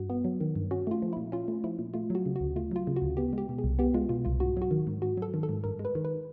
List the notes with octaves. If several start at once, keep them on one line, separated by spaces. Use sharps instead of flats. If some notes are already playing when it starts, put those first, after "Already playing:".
Already playing: G2 F#4
B3
F#3
D#3
G2
C#4 F#4
A3 F4
F3
A#2 E4
C#4 F4
A3
F3 E4
A#2
A3 F4
F#3 F#4
C#3
D2 F#4
A3 F4
F#3 F4
C#3
F#4
D2
B3 G4
G#3 G4
B2
G#4
C2
B3 G4
G#3 F4
B2 F4
C2 F4
G#2 F#4
F#3 F#4
D#3
G#2
G#2 F#4
F#3 A4
D#3
A4
G#2
G2 A#4
G#3
B4
D#3
B4